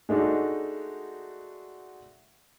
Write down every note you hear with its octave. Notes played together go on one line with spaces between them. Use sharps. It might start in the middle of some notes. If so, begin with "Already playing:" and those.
G#3 A3 D4 D#4 F#4